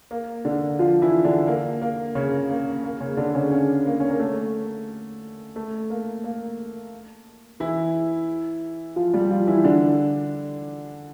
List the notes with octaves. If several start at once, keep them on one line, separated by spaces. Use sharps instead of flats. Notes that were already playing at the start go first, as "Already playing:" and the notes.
A#3
D3 D4
F3 F4
E3 E4
D3 D4
A#3
A#3
C#3 C#4
A#3
A#3
C#3 C#4
D3 D4
C#3 C#4
C#3 C#4
A#3
C#4
A#3
A3
A3
A#3
A#3
E3 E4
F3 F4
G3 G4
F3 F4
E3 E4
D3 D4